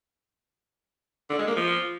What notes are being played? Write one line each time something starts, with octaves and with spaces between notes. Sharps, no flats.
D3
G#3
A#3
F3